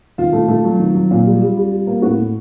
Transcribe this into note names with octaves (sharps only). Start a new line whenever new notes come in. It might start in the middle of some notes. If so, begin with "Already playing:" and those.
D#3 F4
A3
A3
F#3
D#3
F#3
A#2 F4
G3
G3
G3
G3
A#3
A2 F#4
A2